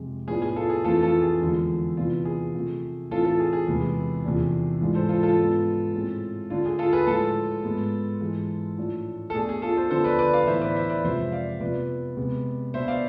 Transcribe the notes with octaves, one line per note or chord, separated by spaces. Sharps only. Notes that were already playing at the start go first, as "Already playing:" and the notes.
Already playing: F2 C3 G#3
A2 F3 B3 D4 G#4
G#4
F4 A4
G#4
F2 E3 A3 C4 F4 A4
F4 A4
G#4
E2 D3 F3 G#3
C3 E3 B3 D4 F4
G#4
C3 F3 A3
A2 E3 A3 C4 F4 A4
F4 A4
G#4
G#4
E2 C3 G#3 B3
E2 C3 F3 A3 D4
G#2 E3 G#3 D4 F4
A4 C5
F4 A4
F4 A4
G#2 F3 G#3 B3 D4
A2 G#3 C4
D3 A3 D4 F4
G#4
F4 A4
G#4 B4
A2 F3 G#3 F4 A4
G#2 G#3 B3
G#2 E3 G#3
A2 F3 A3 D4
A4
B2 A3 D4 G#4
G#4
F4 A4
A4 C5
D3 F3 B3 D4 A4 C5
B4 D5
B4 D5
D5 F5
A2 E3 B3 D4 C5 E5
B4 D5
C5 E5
B4 D5
F2 C3 F3 G#3 C5 E5
D5 F5
C3 F3 B3 B4 D5
C3 G#3 B3
B2 B3 D4 C5 E5
D5 F5